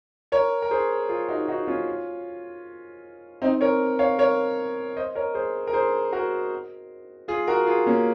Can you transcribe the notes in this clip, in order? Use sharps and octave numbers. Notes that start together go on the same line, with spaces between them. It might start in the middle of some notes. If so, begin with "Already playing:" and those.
A#4 C#5
A#4
G#4 C5
F4 G#4
D#4 F#4
D#4 F#4
C#4 F4
C4 D#4
A#4 C#5
C#5 F5
A#4 C#5
C5 D#5
A#4 C#5
G#4 C5
A#4
G#4 C5
F#4 A#4
F4 G#4
F#4 A#4
F4 G#4
A#3 C#4